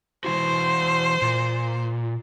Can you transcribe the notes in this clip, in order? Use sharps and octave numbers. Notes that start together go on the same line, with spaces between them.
E3 E4 F#4 C5
A#2